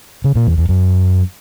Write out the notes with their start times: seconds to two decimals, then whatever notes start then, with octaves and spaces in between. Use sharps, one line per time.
0.24 C#3
0.36 A#2
0.47 E2
0.58 E2
0.69 F#2